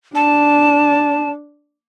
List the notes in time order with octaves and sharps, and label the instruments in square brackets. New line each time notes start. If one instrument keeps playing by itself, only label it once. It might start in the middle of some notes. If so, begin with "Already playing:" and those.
[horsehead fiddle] D4 [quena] A5